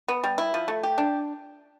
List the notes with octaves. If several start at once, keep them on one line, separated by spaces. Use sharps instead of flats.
B3
G3
E4
F3
A3
G4
D4